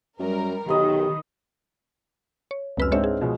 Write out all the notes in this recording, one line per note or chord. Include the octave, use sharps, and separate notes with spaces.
F#2 G3 A#4
B1 D#3 G4 D#5 B5
C#5
F1 C#2 F#2 B4 E6 F6
G#2 G#3 C4 D4 C#5 E5
G#4
B2 F3 G#3